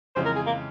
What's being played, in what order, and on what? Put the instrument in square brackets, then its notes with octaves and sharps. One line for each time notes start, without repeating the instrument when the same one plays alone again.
[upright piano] F2 C#3 E3 G#3 C#4 [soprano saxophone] C5
[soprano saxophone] A#4
G#4
A#3